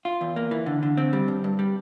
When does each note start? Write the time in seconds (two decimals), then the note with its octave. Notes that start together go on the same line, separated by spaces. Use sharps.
0.05 F4
0.21 E2
0.36 A#3
0.51 E3
0.66 D3
0.83 D3
0.97 C4
1.13 G3
1.28 G2
1.44 G2
1.59 G3